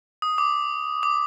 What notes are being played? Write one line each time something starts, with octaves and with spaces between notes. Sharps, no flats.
D#6
D6
D6